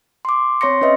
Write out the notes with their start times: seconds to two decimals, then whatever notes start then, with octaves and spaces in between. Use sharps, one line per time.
0.25 C6 D6
0.61 C4 C#5 C6 C#6 A#6 C#7
0.81 C#4 B4 D#5 E5